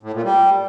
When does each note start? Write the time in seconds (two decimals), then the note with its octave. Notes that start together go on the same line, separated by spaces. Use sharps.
0.03 A2
0.13 A#2
0.24 G3